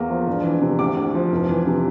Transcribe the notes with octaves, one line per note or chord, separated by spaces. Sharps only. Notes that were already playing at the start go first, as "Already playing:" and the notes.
Already playing: E2 A#3
F3
E1
E3
C3
D2 D6
D2
F3
F1
E3
C3